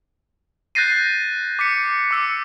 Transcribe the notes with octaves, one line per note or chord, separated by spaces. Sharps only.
F#6 G6 A6 A#6 C7 D#7
D6 B6 C#7
D6 E6 C#7